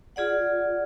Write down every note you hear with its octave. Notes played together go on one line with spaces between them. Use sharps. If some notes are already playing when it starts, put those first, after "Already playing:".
F4 G#4 D5 F#5